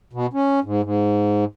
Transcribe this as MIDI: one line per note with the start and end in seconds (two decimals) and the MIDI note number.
0.13 0.26 47
0.33 0.60 61
0.64 0.82 44
0.83 1.45 44